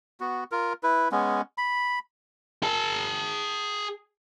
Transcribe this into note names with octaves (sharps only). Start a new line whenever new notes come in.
B3 F#4
F4 A#4
E4 B4
G#3 B3 C#4
B5
G#4 A5